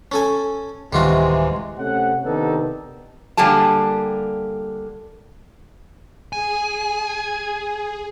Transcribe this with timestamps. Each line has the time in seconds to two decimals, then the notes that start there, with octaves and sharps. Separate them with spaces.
0.12 C#4 A4 G#5
0.93 D1 C3 D#3 E3 G3 G#3 F4 F#4
1.77 C3 A3 C#4 F#5
2.24 C3 D#3 B3 D4 D#4 A4
3.37 D3 G3 A#3 G4 G#4 A5
6.33 G#4 G#5